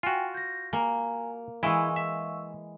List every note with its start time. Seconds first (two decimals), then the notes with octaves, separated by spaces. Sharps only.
0.03 F4 F#4 G5 G#5
0.34 G6 A#6
0.73 A#3 G#5 A#5
1.63 E3 G#3 E4 F5 C#6 E6
1.96 E5